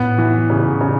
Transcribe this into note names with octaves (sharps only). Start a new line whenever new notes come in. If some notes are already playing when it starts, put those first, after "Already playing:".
Already playing: A2 B3
E3
C#3
C#3